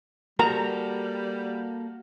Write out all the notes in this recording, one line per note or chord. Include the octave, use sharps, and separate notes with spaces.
G3 A#3 F#4 A4 A#5